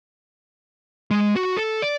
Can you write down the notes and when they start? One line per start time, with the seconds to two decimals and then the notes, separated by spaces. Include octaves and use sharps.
1.11 G#3
1.36 F#4
1.57 A4
1.82 D5